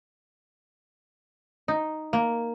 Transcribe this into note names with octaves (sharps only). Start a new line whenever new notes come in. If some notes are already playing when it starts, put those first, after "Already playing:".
D#4
A#3